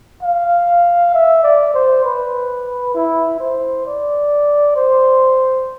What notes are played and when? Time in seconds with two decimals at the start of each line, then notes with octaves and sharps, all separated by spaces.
0.23 F5
1.14 E5
1.43 D5
1.74 C5
2.05 B4
2.95 E4
3.40 C5
3.86 D5
4.76 C5